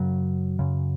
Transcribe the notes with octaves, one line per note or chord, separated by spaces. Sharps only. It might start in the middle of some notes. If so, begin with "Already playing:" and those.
Already playing: F#2 C#3 F#3
F#2 C#3